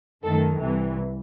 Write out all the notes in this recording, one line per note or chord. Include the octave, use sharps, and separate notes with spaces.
F#2 D#3 A3 A4
C2 C3 E3